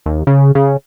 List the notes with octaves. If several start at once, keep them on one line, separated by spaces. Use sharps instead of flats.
D#2
C#3
C#3